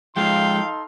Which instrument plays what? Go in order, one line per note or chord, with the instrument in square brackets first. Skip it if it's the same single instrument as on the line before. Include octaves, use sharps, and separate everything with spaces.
[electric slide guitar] F3 G#3 F4 [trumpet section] D#4 A4 C6 [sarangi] F5 [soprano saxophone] G5